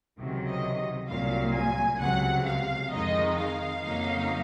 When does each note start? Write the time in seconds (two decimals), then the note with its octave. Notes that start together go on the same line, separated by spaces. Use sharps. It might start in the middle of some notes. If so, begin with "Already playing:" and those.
0.18 C#2 C3 D#3 F#3
0.48 D#5
1.08 C2 A#2 F#3 F5
1.54 G#5
2.00 C#2 C3 F#3 F#5
2.46 F5
2.91 F2 D#3 G#3 D#4 D#5
3.37 F5
3.82 F2 C#3 F#3 A#3 D#4